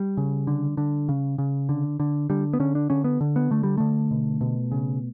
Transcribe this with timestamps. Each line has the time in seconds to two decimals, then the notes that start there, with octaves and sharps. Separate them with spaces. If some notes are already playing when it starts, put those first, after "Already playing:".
Already playing: G3
0.17 C#3
0.47 D3
0.77 D3
1.09 C#3
1.38 C#3
1.69 D3
2.00 D3
2.30 D3 G3
2.53 B3
2.60 D3 C#4
2.75 D4
2.90 D3 C#4
3.04 B3
3.21 D3
3.36 B3
3.51 D3 A3
3.63 G3
3.78 D3 A3
4.11 B2
4.41 B2
4.72 C#3